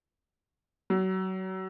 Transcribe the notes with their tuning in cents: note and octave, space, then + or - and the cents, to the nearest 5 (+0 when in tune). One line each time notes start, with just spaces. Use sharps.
F#3 +30